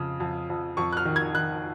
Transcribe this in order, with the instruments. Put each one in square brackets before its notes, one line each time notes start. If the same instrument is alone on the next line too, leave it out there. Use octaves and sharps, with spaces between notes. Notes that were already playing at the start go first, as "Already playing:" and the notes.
Already playing: [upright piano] F2 C#3
F2
F2
F2 C#6
F#6
F6
D#3
G#6
D#3 F#6